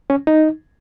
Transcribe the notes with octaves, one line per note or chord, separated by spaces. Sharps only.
C#4
D#4